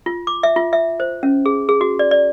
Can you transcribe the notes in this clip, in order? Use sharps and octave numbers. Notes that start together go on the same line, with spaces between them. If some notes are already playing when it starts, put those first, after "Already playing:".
F4
D6
E5
F4
E5
C5
C#4
G#4
G#4
F#4
D5
D5